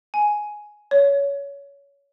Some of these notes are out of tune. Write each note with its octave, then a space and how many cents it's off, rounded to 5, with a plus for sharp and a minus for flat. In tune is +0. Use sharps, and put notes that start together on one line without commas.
G#5 +5
C#5 +20